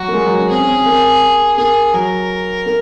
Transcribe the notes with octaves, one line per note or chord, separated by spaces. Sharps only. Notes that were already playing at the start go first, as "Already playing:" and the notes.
Already playing: F#3 F#4
A#3
G#3
F#3
C#4
C4 G#4
C#4
C4
A#3
A#3 G#4
F#3 A#4
A#3